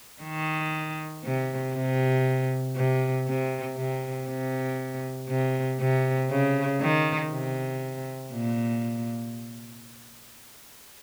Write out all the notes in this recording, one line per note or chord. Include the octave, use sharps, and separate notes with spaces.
D#3
C3
C3
C3
C3
C3
C3
C3
C3
C#3
D#3
C3
A#2